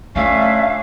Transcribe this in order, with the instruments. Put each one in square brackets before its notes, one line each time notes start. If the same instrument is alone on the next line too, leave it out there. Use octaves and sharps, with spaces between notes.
[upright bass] A3 [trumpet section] C#4 D4 F4 [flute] E5 [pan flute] F5